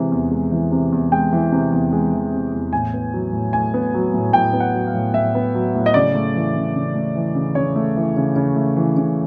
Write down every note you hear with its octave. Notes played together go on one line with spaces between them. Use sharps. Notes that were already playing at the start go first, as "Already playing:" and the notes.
Already playing: C3 E3 G#3
E2
G#3
E3
C3
E2
G#3 G5
E3
C3
E2
G#3
E3
C3
E2
A2 G#5
B3
F#3
A2
A2 G#5
B3
F#3
A2
A2 G5
B3
F#5
F#3
F5
A2
A2 E5
B3
F#3
A2
D#5
C#3 D5
A3
E3
C#3
C#3
A3
E3
C#3
C#3 C#5
A3
E3
C#3
C#3
A3
E3
C#3